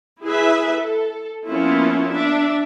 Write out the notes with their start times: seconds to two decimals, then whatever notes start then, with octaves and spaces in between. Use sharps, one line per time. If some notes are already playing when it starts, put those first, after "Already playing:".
0.23 E4 G#4 B4 E5
0.77 A4
1.48 F3 A#3 B3 C#4 E4 F4
2.10 D4 E5